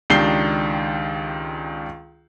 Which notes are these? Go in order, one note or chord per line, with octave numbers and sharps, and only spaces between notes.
C#2 D#3 D4 G4 C7 G7